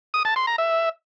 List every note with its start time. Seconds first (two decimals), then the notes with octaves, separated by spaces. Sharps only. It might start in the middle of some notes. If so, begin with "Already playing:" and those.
0.14 D#6
0.25 A5
0.36 C6
0.47 A#5
0.58 E5